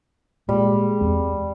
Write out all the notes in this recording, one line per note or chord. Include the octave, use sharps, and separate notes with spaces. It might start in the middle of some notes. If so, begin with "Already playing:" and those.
A#2 G3 G#3
E2 C4